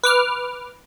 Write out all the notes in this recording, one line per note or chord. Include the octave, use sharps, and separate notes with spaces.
B4 D6 F6